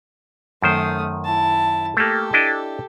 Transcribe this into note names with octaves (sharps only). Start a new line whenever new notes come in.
F#2 D#3 A3 C5 D#6
E4 A5
A3 A#3 G4 A4
D4 E4 D#5